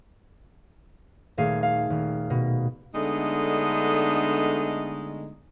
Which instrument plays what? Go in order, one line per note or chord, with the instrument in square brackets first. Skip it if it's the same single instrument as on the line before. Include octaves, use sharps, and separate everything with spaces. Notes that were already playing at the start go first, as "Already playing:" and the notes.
[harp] D#1 A3 G#4 F5
F5
D#1
B2
[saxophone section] D3 G#3 A3 B3 D4 D#4